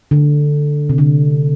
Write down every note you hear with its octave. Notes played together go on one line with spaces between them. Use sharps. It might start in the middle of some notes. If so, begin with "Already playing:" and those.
D3
C3
D3